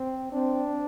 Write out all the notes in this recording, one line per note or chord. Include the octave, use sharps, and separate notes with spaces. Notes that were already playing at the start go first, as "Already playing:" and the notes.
Already playing: C4
C4 D4